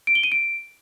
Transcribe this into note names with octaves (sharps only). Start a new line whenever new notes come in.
D7
G7
D#7
D7